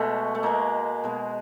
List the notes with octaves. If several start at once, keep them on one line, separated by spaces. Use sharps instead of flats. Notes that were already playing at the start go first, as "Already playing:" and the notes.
Already playing: B2 G#3 A3
A3
B2 G#3 A#3
B2 G#3